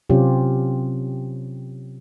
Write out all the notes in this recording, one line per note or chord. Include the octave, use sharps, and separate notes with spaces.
C3 F#3 C4 C#4 F4 G4